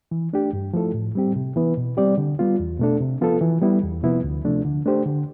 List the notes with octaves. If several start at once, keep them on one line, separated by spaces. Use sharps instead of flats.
E3
A3 D4 G4
G2
F3 A3 E4 A4
A2
G3 C4 G4
C3
E3 B3 E4 B4
B2
G3 C4 G4 D5
D3
G3 B3 F4
E2
B2 A3 D4 A4
C3
F3 B3 F4 A4
E3
G3 B3 E4
E2
C3 F3 B3 E4
D2
C3 F3 A3 D4
D3
A3 D4 G4 C5
D3